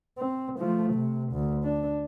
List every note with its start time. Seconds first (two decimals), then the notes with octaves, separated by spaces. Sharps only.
0.19 C4
0.58 F3 A3
0.94 C3
1.33 D2
1.64 D4